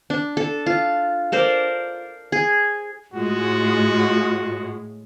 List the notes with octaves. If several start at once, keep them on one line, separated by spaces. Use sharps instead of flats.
D4
A4
F4
A4 A#4 C5 D5
G#4
A2 G#3 F4 F#4